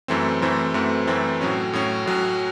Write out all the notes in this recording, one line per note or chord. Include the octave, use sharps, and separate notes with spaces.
F#2 E3 A3 C4
F#2 E3 A3 C4
F#2 E3 A3 C4
F#2 E3 A3 C4
A2 F#3 C#4
A2 F#3 C#4
A2 F#3 C#4